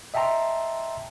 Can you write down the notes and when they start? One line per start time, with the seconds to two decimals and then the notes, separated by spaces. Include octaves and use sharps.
0.14 D#5 E5 G5 A5 A#5 C6